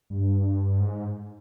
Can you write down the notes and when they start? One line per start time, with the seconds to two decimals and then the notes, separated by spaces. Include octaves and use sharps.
0.10 G2
0.80 G#2